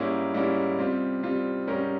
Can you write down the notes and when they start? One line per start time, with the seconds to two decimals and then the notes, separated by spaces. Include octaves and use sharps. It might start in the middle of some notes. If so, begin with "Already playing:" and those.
Already playing: G#2 G3 A#3 C#4 E4
0.34 G#2 G3 A#3 C#4 E4
0.78 C3 G3 C4 F4
1.23 C3 G3 C4 F4
1.67 G#2 G3 C#4 G4 A#4